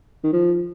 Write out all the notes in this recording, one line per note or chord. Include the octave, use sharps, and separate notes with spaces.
D#3
F3